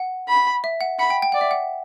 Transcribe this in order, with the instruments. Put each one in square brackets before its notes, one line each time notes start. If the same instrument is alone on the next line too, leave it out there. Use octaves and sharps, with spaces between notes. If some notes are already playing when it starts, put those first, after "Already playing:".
Already playing: [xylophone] F#5
[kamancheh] B5
[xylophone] E5
F#5
[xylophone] F#5 [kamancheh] B5
[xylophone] G5
G5
[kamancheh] D5 [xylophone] F#5
[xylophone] E5
F#5